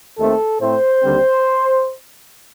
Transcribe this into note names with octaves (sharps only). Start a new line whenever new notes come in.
D#2 D#3 A3 C4 A4
A2 A3 C4 C5
D#2 D3 G3 C4